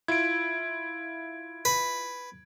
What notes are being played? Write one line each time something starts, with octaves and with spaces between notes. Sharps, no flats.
E4 F4 G#6 D7
B4